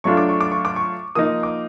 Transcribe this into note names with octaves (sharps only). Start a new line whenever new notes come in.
F#3 A3 D4 F4 C#6
D6
C#6
D6
C#6
D6
C#6
F3 A#3 D#4 D#6
D6